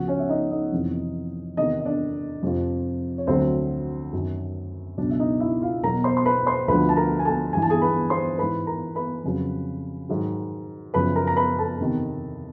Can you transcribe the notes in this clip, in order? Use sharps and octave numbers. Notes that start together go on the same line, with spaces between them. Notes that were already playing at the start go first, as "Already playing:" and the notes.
Already playing: C#2 C#3 F3 F#4 F#5
C#4 C#5
E5
D#4 D#5
D#4 D#5
F2 C3 E3
E2 C3 D#3 D#4 D#5
D#5
D4 D5
F2 C3 F3
C#5
D2 D3 F#3 C4 C5
F#2 D#3 F#3
C#2 B2 F#3 D4 D5
E5
D#4 D#5
E4 E5
F4 F5
E2 B2 F#3 A#4 A#5
C5 C6
C6
B4 B5
C5 C6
D2 D3 F3 B4 B5
A5
A#4 A#5
G#5
A4 A5
G2 E3 G#5
A5
G#4 G#5
B4 B5
C5 C6
G#2 E3 B4 B5
A#4 A#5
B4 B5
F2 C#3 F#3
G#2 D#3 F#3
F#2 C#3 F3 B4 B5
A#4 A#5
A#5
B4 B5
A4 A5
E2 C3 D#3